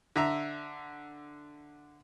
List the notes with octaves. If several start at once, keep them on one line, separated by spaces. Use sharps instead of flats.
D3 E5 A#5